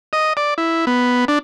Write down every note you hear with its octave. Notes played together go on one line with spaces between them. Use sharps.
D#5
D5
E4
B3
D4